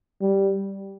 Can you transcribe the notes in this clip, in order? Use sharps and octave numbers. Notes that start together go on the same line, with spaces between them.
G3